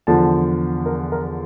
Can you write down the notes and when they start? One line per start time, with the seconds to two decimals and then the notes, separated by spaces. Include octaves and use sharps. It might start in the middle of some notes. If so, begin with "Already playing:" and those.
0.07 E2 D3 F3 A5
0.86 A#4
1.12 A#4